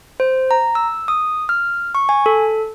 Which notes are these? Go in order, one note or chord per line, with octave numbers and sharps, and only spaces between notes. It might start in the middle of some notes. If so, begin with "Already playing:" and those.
C5
A#5
E6
D#6
F6
C#6
G#5
A4